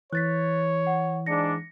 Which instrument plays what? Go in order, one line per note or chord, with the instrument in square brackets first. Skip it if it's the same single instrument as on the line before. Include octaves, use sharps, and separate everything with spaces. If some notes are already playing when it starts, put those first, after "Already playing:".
[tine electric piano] E3 [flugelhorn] C#5 [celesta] F#6 A6 B6
[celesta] F#5
[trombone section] G#2 D4 [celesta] A#6 C#7